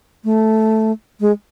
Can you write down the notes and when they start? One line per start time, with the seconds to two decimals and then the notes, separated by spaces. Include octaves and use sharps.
0.24 A3
1.21 G#3